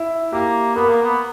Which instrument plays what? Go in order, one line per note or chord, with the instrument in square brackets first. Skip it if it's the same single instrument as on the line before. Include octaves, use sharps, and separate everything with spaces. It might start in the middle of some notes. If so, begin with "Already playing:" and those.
Already playing: [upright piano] E4
[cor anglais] A#3 [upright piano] G4
[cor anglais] B3 [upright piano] A#4
[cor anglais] A#3
B3